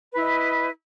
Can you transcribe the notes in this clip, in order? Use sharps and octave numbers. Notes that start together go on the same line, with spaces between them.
E4 B4 D#5